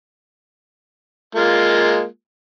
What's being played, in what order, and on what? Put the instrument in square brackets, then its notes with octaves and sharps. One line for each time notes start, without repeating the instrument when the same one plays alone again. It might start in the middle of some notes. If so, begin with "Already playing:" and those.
[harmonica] G#3 A#3 F4